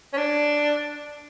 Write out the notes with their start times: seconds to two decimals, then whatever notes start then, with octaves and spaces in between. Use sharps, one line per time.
0.13 C#4
0.18 D4